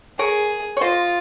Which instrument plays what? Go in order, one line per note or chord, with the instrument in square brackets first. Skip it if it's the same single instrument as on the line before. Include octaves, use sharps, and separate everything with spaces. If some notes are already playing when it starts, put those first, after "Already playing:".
[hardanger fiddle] G#4 [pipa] A#4 C#5
[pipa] C#5
[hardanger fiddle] F4 [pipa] C5 D#5